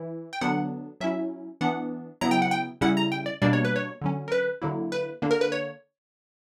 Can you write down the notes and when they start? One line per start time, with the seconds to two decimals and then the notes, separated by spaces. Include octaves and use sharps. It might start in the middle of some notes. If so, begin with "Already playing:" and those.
Already playing: E3 E4
0.33 G5
0.41 D3 F#3 B3 D4 F#5
1.01 F#3 C#4 E4 E5
1.61 E3 B3 D4 F#5
2.21 C#3 F#3 B3 E4 A#5
2.31 G5
2.42 F#5
2.51 G5
2.81 C#3 G3 C#4 E4 F#5
2.97 A#5
3.12 G5
3.26 D5
3.42 B2 G3 A#3 D4 D5
3.53 C#5
3.65 B4
3.76 C#5
4.01 D3 F#3 C#4
4.28 A#4
4.32 B4
4.62 D3 F#3 A#3 E4
4.92 B4
5.22 D3 A#3 D4
5.31 A#4
5.41 B4
5.52 C#5